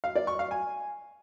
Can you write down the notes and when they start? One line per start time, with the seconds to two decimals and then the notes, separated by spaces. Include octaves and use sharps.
0.04 F5
0.15 D5
0.27 C#6
0.39 F5
0.51 G#5